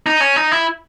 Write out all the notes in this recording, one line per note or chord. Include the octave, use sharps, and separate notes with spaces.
D#4
C#4
D#4
E4